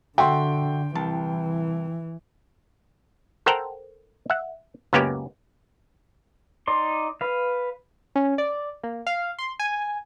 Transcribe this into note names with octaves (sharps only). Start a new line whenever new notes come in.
D3 F#4 A4 E5 G5 C6
C2 E3 A5
A4 A#4 C5 F#5 G5 A#5
E5 F#5
C#2 F#2 A#3 B3 C#4 G4
D#4 D5 C6
B4 F5
C#4
D5
A#3
F5
C6
G#5